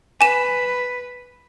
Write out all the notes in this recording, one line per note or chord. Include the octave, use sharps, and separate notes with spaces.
B4 G#5 E7